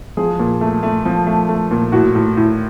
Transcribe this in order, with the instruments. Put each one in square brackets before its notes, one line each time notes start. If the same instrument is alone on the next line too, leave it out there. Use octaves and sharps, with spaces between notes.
[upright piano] F3 G#4
A#2
A3
A3
F3
A3
A3
A#2
A2 F#4
A2
A2